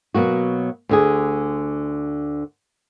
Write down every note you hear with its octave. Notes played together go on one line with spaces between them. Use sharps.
B2 F#3 A#3 F#4
D2 D3 G#4